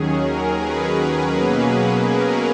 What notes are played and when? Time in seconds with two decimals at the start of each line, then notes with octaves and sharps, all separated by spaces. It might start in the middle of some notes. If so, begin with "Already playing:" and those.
Already playing: D#2 D#3 F#3 C#4 G#4
0.22 A#4
0.58 G#4 B4
1.32 B2 F#3 A#3 C#4
2.05 A#4